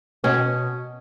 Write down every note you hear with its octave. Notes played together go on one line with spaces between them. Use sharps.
B2 C#4